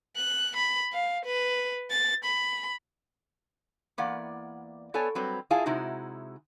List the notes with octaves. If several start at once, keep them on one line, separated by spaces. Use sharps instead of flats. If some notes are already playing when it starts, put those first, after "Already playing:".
F#6
B5
F5
B4
A6
B5
E2 A#3 D5 F#5
B3 A4 C#5 D5 G#5
F#3 G3 C4 B4
E4 F4 G#4 F5 G#5 A5
C3 G#3 D#4 E4 F#4